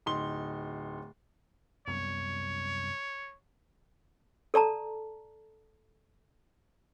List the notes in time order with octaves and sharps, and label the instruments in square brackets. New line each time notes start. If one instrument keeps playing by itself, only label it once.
[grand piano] D1 D#4 C6 G7
[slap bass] C2 F#2 B3 [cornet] C#5
[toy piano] A4 D5 A5 A#5